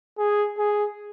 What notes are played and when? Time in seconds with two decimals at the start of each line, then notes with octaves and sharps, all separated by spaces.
0.18 G#4
0.58 G#4